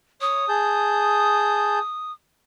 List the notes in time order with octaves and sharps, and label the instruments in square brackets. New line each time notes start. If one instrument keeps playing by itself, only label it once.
[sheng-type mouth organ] C#5 [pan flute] D#6
[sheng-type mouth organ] G#4 A5 G6